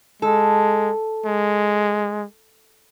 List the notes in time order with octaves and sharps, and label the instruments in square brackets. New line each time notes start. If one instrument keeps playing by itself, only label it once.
[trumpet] G#3 [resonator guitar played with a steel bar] A4
[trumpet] G#3